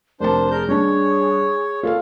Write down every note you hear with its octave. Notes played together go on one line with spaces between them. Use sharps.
F1 D4 A#4 C5 A5
G#4 A#4 G6
G3 D4 C#5
F4 A4 F5